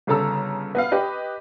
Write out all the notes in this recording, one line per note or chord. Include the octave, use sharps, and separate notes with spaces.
G1 C#3 A4 A#5 E6
B3 B4 F5
G4 B4 D#5